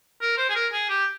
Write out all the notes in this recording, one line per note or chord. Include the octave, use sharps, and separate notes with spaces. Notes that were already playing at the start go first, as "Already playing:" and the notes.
A#4
C5
G#4
A#4
G#4
G4